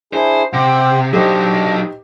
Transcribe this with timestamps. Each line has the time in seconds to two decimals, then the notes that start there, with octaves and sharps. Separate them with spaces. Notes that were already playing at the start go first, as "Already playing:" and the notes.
0.13 D4 E4 G#4 C5
0.53 C3 C5 F#5 G5
1.13 F#3 D4 D#4 G4 C5 D#5